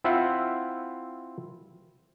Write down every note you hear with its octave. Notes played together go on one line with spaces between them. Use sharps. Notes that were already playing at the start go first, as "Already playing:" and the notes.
C4 E4 F4 E5 F#5